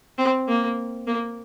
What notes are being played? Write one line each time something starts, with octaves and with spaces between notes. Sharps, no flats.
C4
A#3
A#3